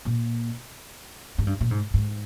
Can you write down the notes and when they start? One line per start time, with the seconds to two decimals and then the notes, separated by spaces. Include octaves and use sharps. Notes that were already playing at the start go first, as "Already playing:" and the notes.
0.05 A#2
1.38 G#2
1.47 G2
1.61 A#2
1.71 G#2
1.94 G#2